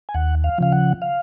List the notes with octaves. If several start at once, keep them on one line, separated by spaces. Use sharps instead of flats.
G#5
D#2 F#5
F5
C#3 F3 F5
F#5
F5